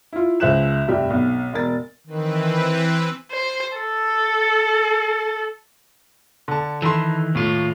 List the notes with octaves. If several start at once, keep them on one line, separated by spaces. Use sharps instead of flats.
E4 F4
C#2 C5 E5 F#6 E7
F1 G2 G4 E5
B1
E1 A#4 A6
D#3 E3 C4 B4
C5
A4
D3 A5
D#3 E3 A4 B5 C6
D#2 A2 F4